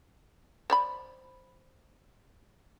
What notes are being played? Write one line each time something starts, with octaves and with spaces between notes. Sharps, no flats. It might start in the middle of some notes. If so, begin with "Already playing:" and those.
C5 D5 B5